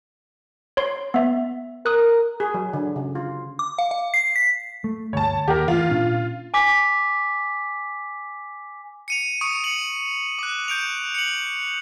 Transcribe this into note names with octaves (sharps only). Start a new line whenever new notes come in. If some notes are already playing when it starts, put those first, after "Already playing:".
C#5 C6
B3 E5
A#4 D#6 F#6
G#4
F#3
D3
C#3
F4
D6
F5
F5
C7
B6
A3
G1 D2 C#5 A5
D#2 G4 A#4
A2 E3 F4
A#2 C#4 D4
G#5 D6 B6
C#7 D#7 F7
C#6 D#6 C#7 D7
C#7 F#7
D6 F#6
G6 D7 F7
C#7 D7 F#7